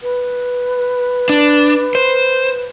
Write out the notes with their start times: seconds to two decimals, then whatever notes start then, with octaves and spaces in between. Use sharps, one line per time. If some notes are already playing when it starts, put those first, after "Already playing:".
0.03 B4
1.29 D4
1.95 C5